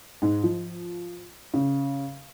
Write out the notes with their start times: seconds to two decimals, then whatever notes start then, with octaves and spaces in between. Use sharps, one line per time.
0.22 G#2
0.43 F3
1.54 C#3